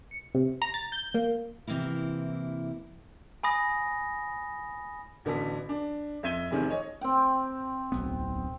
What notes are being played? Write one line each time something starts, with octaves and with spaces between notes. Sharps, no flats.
C#7
C3
A#5
A6
G6
A#3
C3 E3 A#3 E4
G#5 B5 D#6 A#6
A1 D3 B3 F#4 A4 B6
D4
F2 E5 G#6 D#7 G7
F1 E2 C3 D#3
C#5 D#5
C4 G5
D1 B1 B3